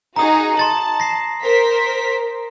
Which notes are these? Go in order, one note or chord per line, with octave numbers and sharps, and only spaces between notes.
D#4 F#4 G#4 A#5 D#6
A5 C6 A6 F#7
A#6 C7
A#4 C5 B6